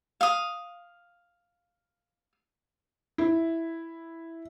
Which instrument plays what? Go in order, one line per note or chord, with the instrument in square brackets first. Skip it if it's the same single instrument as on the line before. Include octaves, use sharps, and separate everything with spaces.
[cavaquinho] F5 D#6
[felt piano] E4